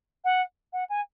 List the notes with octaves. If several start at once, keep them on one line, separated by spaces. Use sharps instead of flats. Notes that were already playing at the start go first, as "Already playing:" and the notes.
F#5
F#5
G#5